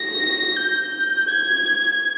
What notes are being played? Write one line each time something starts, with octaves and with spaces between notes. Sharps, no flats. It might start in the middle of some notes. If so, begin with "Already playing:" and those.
Already playing: A#6
G6
G#6